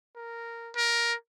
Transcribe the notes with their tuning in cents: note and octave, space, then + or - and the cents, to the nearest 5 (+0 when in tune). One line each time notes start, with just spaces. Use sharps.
A#4 -5
A#4 +10